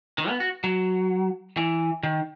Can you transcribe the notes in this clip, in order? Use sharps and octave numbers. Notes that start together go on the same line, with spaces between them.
D#3
B3
F#4
F#3
E3
D#3